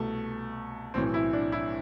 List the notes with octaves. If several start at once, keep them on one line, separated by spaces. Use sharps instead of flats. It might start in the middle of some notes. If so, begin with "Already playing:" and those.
Already playing: C2 B2 A3
B1 A2 E3 C4
E4
D4
E4